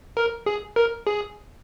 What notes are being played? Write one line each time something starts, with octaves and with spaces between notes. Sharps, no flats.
A#4
G#4
A#4
G#4